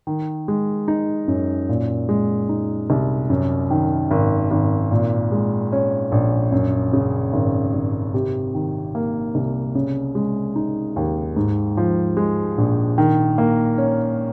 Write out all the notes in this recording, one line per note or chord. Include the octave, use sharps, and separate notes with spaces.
D#3
G#3
D#4
F#2
A#2
G#3
D#4
C2
F#2
D#3
G#1
G#1
A#2
G#3
C#4
A#1
F#2
C#3
G#1
G#1
C3
D#3
A#3
C2
C#3
G#3
D#4
D#2
G#2
F3
G#3
A#1
D#3
A#3
C#4